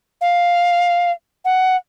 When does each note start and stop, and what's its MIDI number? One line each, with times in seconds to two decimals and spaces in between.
0.21 1.11 77
1.44 1.76 78